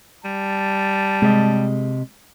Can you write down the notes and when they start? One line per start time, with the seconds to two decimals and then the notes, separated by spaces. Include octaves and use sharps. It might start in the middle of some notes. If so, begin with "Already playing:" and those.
0.25 G3 A5
1.22 C3 G#3 G4 D#5